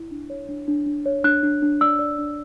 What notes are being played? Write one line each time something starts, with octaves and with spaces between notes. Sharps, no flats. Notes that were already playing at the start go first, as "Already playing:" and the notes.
Already playing: E4
D4
C#5
D4
D4
D4
C#5
D4 F#6
D4
D4
D5 E6
D5
D4